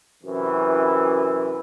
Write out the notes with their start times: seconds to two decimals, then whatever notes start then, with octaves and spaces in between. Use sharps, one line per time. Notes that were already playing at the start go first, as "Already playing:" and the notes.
0.24 F#2 C3 E3